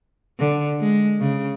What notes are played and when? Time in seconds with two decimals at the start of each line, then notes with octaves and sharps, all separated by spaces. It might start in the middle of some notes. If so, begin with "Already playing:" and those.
0.39 D3
0.81 G#3
1.20 C#3